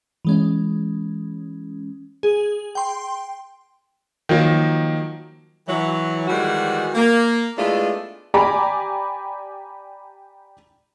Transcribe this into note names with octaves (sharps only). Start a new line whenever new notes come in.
E3 G#3 C#4
G#4
G5 C6
D#3 F3 F#3 A#3
E3 F#3
D#3 E3 G3 G#3 F#4
A#3
G#3 A3 B3 D4 E4 F4
G4 D5 G#5 A#5 B5 D6